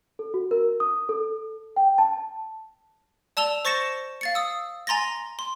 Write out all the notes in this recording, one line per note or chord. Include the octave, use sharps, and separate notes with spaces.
A4
F#4
A#4
D#6
A4
G5
A5
D5 A5 E6 F7 G7
C5 C#6 A6 A#6 C#7 E7
F5 A6 C#7
D#6 E6
G#5 A#5 C6 A6 A#6
C6